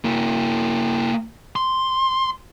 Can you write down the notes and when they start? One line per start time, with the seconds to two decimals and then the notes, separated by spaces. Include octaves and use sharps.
0.05 A#3 E4
1.56 C6